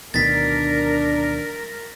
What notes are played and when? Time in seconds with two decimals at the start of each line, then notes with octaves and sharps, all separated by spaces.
0.14 D2 B2 D#3 D4 A#4 A6 B6